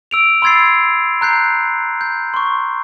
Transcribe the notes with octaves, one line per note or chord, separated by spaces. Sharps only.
E6 D7 F7
B5 C6 E6 G#6 A6 C7
A#5 F#6 G6 C7
G6
C6 C#6